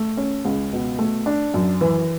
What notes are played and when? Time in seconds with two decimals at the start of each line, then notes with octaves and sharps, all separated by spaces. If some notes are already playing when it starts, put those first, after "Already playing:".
Already playing: A3
0.17 C#4
0.45 C#2
0.73 B2
0.99 A3
1.26 D4
1.54 F#2
1.81 E3